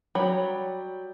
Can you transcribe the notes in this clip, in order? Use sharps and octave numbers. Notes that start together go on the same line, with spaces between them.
F#3 G3 C#5 B5